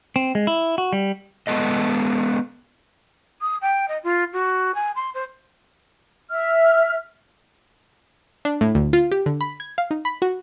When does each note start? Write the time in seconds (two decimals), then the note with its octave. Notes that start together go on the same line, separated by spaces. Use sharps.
0.16 C4
0.35 G#3
0.47 E4
0.78 F#4
0.93 G3
1.47 G#3 B3 A4 D#5
3.41 D#6
3.61 G5
3.88 D#5
4.03 F4
4.33 F#4
4.74 G#5
4.95 C6
5.14 C5
6.30 E5 F6
8.45 D4
8.61 A2
8.75 D2
8.93 F4
9.12 G4
9.26 D3
9.41 B5
9.60 G#6
9.78 F5
9.91 D#4
10.05 B5
10.22 F#4